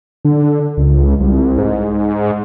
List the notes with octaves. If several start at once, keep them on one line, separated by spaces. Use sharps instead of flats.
D3
C#2
C2
G#2